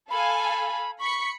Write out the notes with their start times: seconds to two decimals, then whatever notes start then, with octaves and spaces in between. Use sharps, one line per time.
0.10 A4 F5 G#5 B5
0.99 B5 C#6 B6 C#7